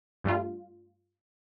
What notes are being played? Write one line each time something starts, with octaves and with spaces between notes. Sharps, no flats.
G2 G3 A3 F4